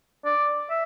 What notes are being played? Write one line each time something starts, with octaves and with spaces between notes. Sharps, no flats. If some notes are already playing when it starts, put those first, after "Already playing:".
D5
E5